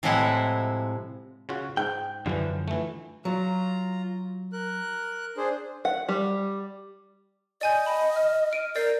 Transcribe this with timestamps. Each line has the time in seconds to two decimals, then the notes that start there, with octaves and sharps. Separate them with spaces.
0.03 A2 C3 F3 G#3 E4 F#5
1.49 C#3 F4 F#4
1.77 G#2 G5
2.26 F#2 D3 E3 F3 G3
2.68 E3 A3
3.25 F#3 F4 A#5
4.53 A#4 F#6
5.37 D4 G#4 C5
5.85 F#5
6.09 G3
7.61 D5 D#5 G#5 G6
7.86 G5 A5 B5
8.16 F6
8.51 F6 D7 D#7
8.76 A#4 D5 G6 C7